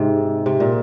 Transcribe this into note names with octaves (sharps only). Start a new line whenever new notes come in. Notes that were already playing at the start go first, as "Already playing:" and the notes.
Already playing: G#2 C3
C3
A#2